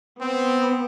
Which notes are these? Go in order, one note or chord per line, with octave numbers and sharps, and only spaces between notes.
B3 C4